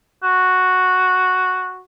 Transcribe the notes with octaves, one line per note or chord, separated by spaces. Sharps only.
F#4